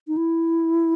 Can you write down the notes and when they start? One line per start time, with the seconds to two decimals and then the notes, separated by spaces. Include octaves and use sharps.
0.08 D#4
0.17 E4